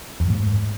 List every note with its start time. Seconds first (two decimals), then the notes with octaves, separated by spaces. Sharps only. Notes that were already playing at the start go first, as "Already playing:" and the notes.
0.20 E2
0.25 F#2
0.30 A2
0.35 G#2